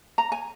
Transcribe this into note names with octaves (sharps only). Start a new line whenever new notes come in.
A#5
G#5